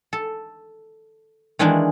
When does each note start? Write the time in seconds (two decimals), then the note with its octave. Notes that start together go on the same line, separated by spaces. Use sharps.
0.13 A4
1.59 D#3 E3 G#3 A#3 D4